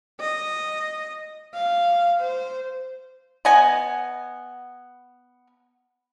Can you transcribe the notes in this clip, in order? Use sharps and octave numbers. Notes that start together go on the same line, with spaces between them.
D#5
F5
C5
B3 D#5 F#5 G#5